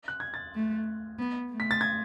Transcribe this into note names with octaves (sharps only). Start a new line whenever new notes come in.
F#6
G#6
A6
A3
B3
A3
B6
A6
G#6